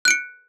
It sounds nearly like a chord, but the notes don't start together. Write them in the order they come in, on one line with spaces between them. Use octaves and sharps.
F#6 D7 C#7